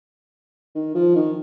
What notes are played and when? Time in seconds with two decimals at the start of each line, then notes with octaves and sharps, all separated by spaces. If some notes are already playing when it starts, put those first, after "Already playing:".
0.75 D#3
0.95 F3
1.16 D#3